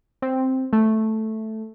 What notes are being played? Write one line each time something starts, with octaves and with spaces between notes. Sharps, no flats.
C4
A3